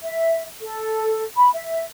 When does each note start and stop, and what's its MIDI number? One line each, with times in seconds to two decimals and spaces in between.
0.01 0.43 76
0.61 1.23 69
1.37 1.50 83
1.54 1.83 76